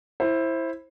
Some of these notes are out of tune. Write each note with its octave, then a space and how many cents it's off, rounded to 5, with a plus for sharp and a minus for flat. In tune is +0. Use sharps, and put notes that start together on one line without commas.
E4 +0 C5 +20